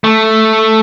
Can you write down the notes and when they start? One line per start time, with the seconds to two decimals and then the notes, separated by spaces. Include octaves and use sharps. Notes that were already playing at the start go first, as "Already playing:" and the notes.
0.04 A3